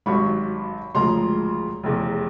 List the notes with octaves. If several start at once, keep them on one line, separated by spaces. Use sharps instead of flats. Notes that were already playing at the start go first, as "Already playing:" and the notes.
G#1 G2 D#3 F#3 B5 C#6
E1 D2 C#3 F3 G#3 A#5 C6
F1 E2 C#3